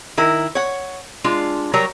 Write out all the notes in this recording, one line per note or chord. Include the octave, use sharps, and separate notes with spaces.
D#3 E4 A#4
C#5 F#5
G#3 D4 F4
F#3 G3 A#4 C#5 A#5